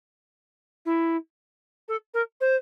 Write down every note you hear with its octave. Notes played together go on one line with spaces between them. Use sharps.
E4
A4
A#4
C5